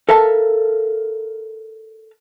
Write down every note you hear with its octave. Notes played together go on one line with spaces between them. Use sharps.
A4 A#4 E5 F5 A5